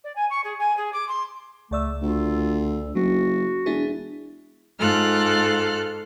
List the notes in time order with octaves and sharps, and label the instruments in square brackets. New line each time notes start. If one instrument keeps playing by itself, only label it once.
[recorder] D5
G#5
C#6
G#4
G#5
G#4
D6
C6
[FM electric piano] C#2 D5 E6 [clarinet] A3
[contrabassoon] D2 [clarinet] F4
[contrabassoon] F#1 [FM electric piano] F#3 [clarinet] F#4
[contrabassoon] E1 [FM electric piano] D4 E4 G#4
[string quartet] G#2 F4 A4 F6 F#6